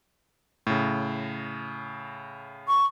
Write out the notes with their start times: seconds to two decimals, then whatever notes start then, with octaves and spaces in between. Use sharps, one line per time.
0.67 A2 C#3
2.67 C#6